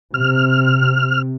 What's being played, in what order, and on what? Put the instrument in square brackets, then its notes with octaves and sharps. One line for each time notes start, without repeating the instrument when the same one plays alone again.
[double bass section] C3 [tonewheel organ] F6